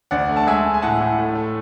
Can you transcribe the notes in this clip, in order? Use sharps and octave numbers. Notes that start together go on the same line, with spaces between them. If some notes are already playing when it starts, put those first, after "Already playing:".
D2 D5 F#5
A3
A5
G#3 E5 G#5
G#3
G#5
A2 F#5 A5
A2
A3
A3